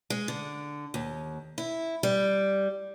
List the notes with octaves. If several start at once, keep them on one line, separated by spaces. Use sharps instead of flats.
G#3
D3
D#2
E4
G3